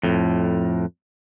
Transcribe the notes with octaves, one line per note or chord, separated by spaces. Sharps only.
F2 A2